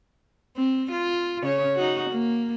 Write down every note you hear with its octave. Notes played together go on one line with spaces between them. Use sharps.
C4
F4
C#3 C#5
D#4 F#4
A#3